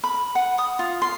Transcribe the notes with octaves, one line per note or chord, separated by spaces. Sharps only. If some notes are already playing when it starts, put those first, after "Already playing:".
B5
F#5
D#6
F4
C6